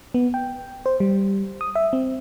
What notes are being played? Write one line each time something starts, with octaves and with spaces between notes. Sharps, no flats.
B3
G5
C5
G3
D#6
E5
C4